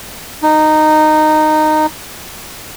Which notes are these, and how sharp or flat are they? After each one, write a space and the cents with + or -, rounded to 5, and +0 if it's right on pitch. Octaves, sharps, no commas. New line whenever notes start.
D#4 -15